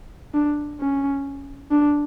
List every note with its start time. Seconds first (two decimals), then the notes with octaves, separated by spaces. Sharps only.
0.34 D4
0.80 C#4
1.71 D4